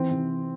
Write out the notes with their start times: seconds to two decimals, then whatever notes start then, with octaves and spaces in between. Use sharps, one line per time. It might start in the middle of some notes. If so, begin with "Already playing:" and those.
Already playing: E3 C4
0.11 C3